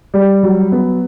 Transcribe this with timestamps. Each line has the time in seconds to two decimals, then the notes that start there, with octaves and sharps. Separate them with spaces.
0.14 G3
0.43 F#3
0.72 B3